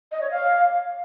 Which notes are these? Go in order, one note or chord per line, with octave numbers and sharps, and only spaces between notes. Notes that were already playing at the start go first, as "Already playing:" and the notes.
D#5
C#5
F5